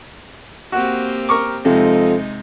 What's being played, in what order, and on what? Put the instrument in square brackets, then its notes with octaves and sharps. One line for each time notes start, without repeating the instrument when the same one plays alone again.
[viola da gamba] A#3 C4 G4 [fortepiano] F#4
[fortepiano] A#4 C#6 D6
[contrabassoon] F2 [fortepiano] C3 [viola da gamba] G#3 D#4